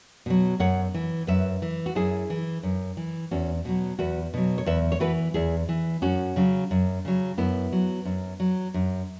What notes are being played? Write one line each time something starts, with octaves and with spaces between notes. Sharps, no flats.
B2 F#3
F#2 C#5 F#5
E3
F#2 B4 E5
E3
F#4
F#2 E4 G#4
E3
F#2
E3
E2 C#4 F#4
B2 F#3
E2 F#4 B4
B2 F#3
C#5
E2 B4 E5
C#5
E3 F#4 B4
E2 E4 G#4
E3
F#2 C#4 F#4
C#3 F#3
F#2
C#3 F#3
F#2 B3 E4
F#3
F#2
F#3
F#2